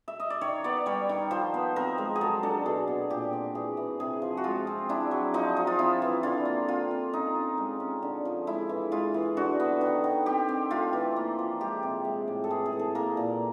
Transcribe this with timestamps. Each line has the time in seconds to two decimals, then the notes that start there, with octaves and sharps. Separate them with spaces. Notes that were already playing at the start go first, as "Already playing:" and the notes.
0.08 E5
0.20 D#5
0.30 D5
0.41 D#3 C#5
0.64 B3 D5
0.86 G3 C#5
1.09 D#3
1.31 F3 C5
1.54 B3
1.76 C4 A#4
1.98 G#3
2.16 G#4
2.21 F#3 A4
2.43 D4 A4
2.66 B2 G#4
2.88 B2
3.10 A#2 G4
3.33 C4
3.55 E3 G#4
3.77 E3
4.00 C3 G#4
4.22 F3
4.37 F#4
4.44 G#3 F4
4.67 C4
4.89 D4 E4
5.11 F#3
5.34 F3 D#4
5.57 F3
5.67 F4
5.79 C4 E4
6.02 E3
6.23 D3 F4
6.45 A#3
6.68 C4 F4
6.91 C4
7.13 C#4 D#4
7.35 C#4
7.58 G#3
7.80 C#4
8.03 D3
8.25 F3
8.47 G#3 E4
8.69 E3
8.92 G#3 F4
9.14 E3
9.37 D3 F#4
9.60 B3
9.81 D#3
10.04 D#3
10.26 C4 G4
10.49 C4
10.71 A3 F4
10.93 E3
11.16 A#3
11.39 F3
11.60 G#3 G4
11.83 C3
12.05 G#3
12.28 A2
12.44 A4
12.50 E3 G#4
12.66 G#4
12.73 E3
12.79 A4
12.95 A#3 A#4
13.17 A#2